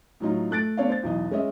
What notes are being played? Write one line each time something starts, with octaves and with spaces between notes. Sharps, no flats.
A2 F#3 D#4 F4
A3 F#6 A6 D7
A3 B3 D4 C#5 D5 F5
C5 A6
B1 E2 D#5
G#3 C#4 D#5 E5